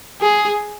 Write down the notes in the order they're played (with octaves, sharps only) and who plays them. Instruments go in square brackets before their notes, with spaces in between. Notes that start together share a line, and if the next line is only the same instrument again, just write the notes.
[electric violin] G#4